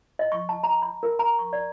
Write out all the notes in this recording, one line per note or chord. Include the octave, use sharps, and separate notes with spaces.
D#5
C#6
A5
A#5
B5
A#4
A#5
C#6
D5